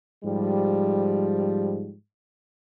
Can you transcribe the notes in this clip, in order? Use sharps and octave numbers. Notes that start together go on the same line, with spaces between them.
G#2 F3 G3